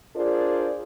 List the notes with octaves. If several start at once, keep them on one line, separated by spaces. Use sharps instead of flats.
D4 F4 G#4 A#4 C5 D5